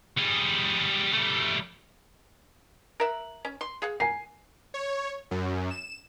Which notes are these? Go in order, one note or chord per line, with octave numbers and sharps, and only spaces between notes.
G3 G#4
G3 A3
A#4 E5 F#5
C#4
C6
G#4 F5 F#5
A#4 G#5 C7
C#5
F#2
E7